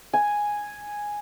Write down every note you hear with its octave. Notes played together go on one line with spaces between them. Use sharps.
G#5